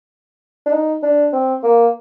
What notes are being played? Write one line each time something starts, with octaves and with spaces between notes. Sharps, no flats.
D4
D#4
D4
C4
A#3